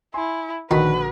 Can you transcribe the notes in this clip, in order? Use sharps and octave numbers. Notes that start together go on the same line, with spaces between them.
E4 G#5 C6
A#1 D3 D#3 F#4 B4 B6